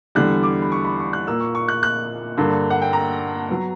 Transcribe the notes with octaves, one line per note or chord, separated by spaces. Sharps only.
E2 D3 G3 F#6
D6
B5
C#6
B5
C#6
F#6
A#2 A#3 E6
C#6
C#6
F#6
F#6
G2 D3 A#3
F#5
G5
A#5
F#3 B3